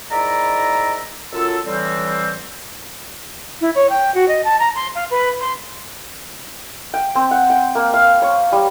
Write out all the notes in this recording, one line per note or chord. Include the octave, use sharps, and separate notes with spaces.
G#2 D#3 E4 D5 E5 A#5
F#2 F4 A4 E6
A2 D3 E3 G3 C4
E4
C#5
G5
F#4
D#5
A5
A#5
C6
F5
B4
C6
G5
C4
F#5
G5
A#3
F5
C#5
G3